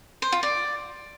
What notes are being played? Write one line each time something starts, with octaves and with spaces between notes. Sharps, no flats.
C5
F4
D5